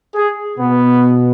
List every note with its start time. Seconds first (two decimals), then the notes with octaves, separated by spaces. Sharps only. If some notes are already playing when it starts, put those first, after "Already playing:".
0.14 G#4
0.58 B2 B3